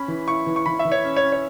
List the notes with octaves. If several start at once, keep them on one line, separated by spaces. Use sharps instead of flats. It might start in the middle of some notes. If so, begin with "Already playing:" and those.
Already playing: C#4 B5
E3
E4 C#6
E3
C#6
E3 B5
E5
E3
C#5
C#4
C#5
C#4
C#5